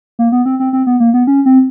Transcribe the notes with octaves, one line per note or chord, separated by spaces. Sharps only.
A#3
B3
C4
C4
C4
B3
A#3
B3
C#4
C4